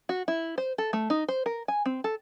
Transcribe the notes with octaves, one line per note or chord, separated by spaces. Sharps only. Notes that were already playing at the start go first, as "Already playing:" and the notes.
F#4
E4
C5
A4
A3
D#4
C5
A#4
G#5
C4
A4